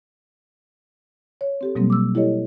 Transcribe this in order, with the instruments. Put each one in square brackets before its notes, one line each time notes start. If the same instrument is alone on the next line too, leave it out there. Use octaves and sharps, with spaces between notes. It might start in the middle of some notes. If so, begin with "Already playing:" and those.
[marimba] C#5
C4 G4 A4
B2 F#3 G3 A#3 C4
D6 E6
E4 G4 A4 C#5 D#5